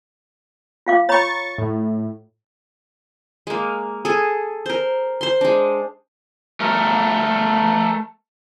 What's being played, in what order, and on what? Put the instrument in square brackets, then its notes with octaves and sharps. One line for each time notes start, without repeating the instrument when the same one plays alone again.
[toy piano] F4 F5 D6
[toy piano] C#5 A#5 B5 [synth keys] C#6 A6
[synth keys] A2
[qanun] G#3 A#3
G#4 A4
A#4 C5
C5 C6
G#3 D4
[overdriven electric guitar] A3 A#4